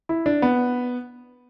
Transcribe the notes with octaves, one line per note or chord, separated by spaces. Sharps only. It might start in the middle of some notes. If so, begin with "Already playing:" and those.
E4
D4
B3